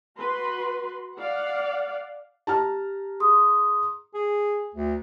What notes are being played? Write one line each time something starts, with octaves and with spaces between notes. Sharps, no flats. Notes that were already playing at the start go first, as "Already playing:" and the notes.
F#4 B4 C6
D5 F5 F#5
G4 A5 A#5 F6
G#4 C6 D#6
G#4
D2